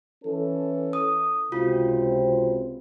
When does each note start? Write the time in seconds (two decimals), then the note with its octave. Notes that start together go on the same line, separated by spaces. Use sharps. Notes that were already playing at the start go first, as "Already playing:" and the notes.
0.24 E3 C#4 A4
0.93 D#6
1.52 C#2 C3 C4 F4 F#4